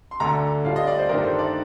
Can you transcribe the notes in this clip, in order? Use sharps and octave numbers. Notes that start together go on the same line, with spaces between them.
C6
D2 D3 A3 A#5
A2 G3 D4 F4 F5
D#5
D5
C5
G2 D#3 A3 D4 A#4
C5
D5